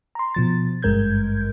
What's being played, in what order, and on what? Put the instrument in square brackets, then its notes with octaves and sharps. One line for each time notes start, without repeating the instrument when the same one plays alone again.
[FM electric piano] A#5 C6
B2 F3 A6
G#1 G2 G#3 A#4 G6 G#6